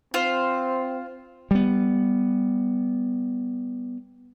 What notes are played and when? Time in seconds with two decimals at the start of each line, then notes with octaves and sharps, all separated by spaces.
0.14 C4 F4 C5
1.51 G3 B3